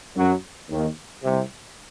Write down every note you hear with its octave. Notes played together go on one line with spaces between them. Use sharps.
F#2 F#3
D#2 D#3
C2 C3